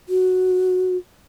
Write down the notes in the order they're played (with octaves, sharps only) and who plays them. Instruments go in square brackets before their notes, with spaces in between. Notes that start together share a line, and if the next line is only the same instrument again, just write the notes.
[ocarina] F#4